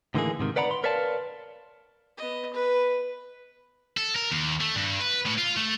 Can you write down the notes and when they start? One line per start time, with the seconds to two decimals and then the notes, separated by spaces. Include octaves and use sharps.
0.14 A2 D3 E3 A#3 D#4 G#4
0.39 G#2 C3 D#3
0.56 B4 D5 F#5 A#5 B5
0.71 C6
0.84 A#4 B4 C#5 D5 F5 A5
2.17 B3 D#5
2.53 B4
3.97 A4
4.15 A#4
4.31 D#2
4.61 A3
4.75 G2
5.00 B4
5.26 A2
5.38 F4
5.57 A3